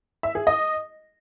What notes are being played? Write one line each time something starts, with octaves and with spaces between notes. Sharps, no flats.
E5
G#4
D#5